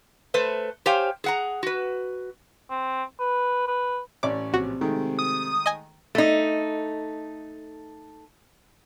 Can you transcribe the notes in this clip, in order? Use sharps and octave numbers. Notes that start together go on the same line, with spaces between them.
A3 B4 C5
G4 C5 C#5 F5 G5 G#5
G#4 F#5 A#5
F#4 B4
C4
B4
B4
A1 C#4 D5 D6
A#1 C3 F#4
D#3 G#3 A3
D#6
D#5 G#5
A3 D#4